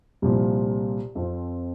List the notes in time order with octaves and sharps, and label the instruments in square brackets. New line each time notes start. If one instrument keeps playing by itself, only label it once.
[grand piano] C2 A#2 F3
F2 F3 C4 F4